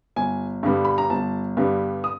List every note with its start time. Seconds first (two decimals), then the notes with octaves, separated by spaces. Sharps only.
0.16 G1 G#5
0.63 G2 D3 G3 B3
0.85 B5
0.98 A#5
1.10 G1 A5
1.57 G2 D3 G3 B3
2.04 D#6